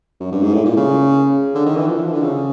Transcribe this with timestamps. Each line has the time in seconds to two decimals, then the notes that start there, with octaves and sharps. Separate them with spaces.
0.20 F#2
0.32 G2
0.43 G#2
0.54 A2
0.65 A#2
0.77 C#3
1.55 D3
1.66 D#3
1.77 E3
1.88 F3
1.96 E3
2.05 F3
2.13 D3
2.22 C#3